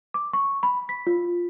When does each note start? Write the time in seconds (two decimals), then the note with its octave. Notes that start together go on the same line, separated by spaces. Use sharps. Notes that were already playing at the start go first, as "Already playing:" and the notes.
0.14 D6
0.33 C#6
0.63 B5
0.89 B6
1.07 F4